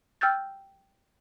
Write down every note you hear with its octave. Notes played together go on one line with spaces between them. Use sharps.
G5 E6 F6 G6 A6